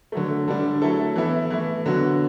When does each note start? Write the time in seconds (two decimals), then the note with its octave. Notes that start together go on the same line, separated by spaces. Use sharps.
0.12 D3 F#3 A3
0.48 D3 G3 D4
0.82 F#3 A3 E4 A4
1.16 E3 B3 E4 A4
1.50 E3 A3 E4
1.85 D3 F#3 B3 F#4